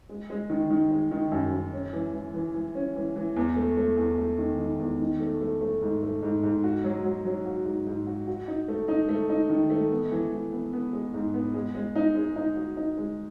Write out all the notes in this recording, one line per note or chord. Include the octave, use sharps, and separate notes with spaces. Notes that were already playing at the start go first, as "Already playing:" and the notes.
G#3
G#3
D#3
D#3
G#3
D#3
F#2
F#2
C#4
E3
E3
E3
E3
C#4
E3
E3
E2
A3
A3
E2
A3
D#3
D#3
E2
D#3
A3
A3
A3
G#2
A3
G#2
G#2
F#4
F#3
F#3
F#3
F#4
G#2
G#2
F#4
F#4
D#4
A3
D#4
A3
D#4
D#3
A3
B3
E3
E3
B3
B3
G#3
G#2
B3
G#3
G#3
D#4
G#3
D#4
F#4
D#4
G#3